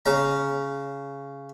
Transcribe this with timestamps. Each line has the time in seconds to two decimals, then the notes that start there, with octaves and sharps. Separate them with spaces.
0.06 C#3 A#5